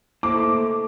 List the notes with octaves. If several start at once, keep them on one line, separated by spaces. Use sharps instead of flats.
A3 A#3 E4 C5 D6